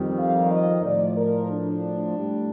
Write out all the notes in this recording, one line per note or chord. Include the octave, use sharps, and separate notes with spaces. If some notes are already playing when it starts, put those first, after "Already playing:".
Already playing: F2 D#3 G3
F5
D#5
A2 F3 D5
A#4
D4
A2 G3